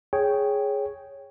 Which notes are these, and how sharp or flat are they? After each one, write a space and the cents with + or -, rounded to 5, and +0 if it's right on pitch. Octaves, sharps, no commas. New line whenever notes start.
G#4 +0 C#5 +0 G5 +0